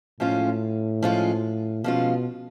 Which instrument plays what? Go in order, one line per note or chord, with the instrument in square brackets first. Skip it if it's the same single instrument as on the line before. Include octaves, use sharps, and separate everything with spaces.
[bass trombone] A2 [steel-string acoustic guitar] F3 G#3 C#4 F4
[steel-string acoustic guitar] F3 G#3 C#4 F4
[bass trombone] B2 [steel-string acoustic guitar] F3 G#3 C#4 F4